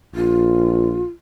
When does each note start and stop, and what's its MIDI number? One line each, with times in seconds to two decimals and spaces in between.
0.15 1.04 34
0.15 1.05 65